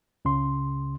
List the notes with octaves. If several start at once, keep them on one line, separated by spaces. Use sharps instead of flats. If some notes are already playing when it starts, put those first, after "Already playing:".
C#2 C#3 C6